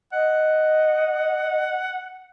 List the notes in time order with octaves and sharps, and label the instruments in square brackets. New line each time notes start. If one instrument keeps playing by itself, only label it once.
[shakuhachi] D#5 [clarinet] F#5